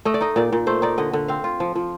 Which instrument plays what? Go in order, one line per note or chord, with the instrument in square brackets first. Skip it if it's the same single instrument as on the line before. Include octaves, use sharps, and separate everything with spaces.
[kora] A3 D#5
D5
D#4 D#5
A#2 D5
A#2
A3 C5
D#4 D5
D3 D#5
D3
C4 F5
F4
F3
F3